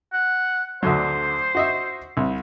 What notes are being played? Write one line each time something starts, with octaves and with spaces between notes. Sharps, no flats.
F#5
D2 D3 F#3 C5
F#4 D#5 E5
C2